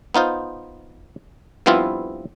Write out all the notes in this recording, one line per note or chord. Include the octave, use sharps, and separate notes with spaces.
B3 D#4 F4 C5
G2 F3 B3 C4 E4 F4